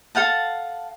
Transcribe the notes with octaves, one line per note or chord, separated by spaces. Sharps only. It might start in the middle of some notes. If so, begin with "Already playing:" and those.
A4 F5 F#5 A5